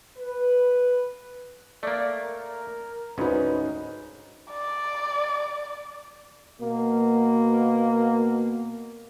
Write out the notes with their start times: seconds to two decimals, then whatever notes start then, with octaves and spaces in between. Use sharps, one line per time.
0.17 B4
1.83 A3 A#3 D5
2.22 A#4
3.18 D2 G#2 C#4 D#4 B4
4.52 D5
6.59 B2 A#3